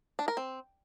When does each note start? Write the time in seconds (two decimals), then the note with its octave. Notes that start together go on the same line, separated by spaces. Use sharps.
0.19 D4
0.28 A#4
0.37 C4